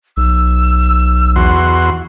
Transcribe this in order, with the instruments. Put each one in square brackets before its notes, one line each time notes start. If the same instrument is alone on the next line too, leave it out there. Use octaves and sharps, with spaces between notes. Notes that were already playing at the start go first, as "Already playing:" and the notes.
[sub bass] B1 [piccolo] E6
[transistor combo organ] E2 F#4 C6